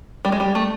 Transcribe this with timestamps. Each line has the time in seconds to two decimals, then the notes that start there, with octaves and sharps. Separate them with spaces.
0.25 G3
0.32 G#3
0.40 G3
0.55 A3